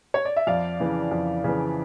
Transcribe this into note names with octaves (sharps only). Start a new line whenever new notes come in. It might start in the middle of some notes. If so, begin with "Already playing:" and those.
C#5
D5
E5
F2 D5 F5
C#3 E3
F2
C#3 E3